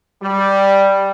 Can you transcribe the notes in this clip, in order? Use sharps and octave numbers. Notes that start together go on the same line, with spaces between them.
G3